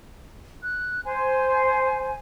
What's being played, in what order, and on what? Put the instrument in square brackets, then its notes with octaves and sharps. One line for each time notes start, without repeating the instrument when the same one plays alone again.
[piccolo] F#6
[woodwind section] C5 [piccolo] G#5